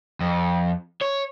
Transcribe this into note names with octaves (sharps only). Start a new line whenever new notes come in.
F2
C#5